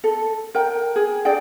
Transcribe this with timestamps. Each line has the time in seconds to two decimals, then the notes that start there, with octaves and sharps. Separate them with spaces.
0.04 A4
0.55 A#4 G5
0.96 G#4
1.25 D4 G#4 D5 G5